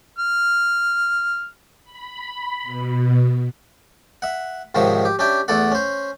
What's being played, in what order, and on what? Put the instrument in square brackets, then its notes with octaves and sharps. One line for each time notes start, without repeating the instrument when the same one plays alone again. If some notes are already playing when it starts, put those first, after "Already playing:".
[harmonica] F6
[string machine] B5
B2
[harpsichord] E5 F#5
G#2 C3 D#3 F3 C#5 E5
G4
C#4 D4 G4 E5 G5
E2 A3 A4 D5 F#5
C#4 C5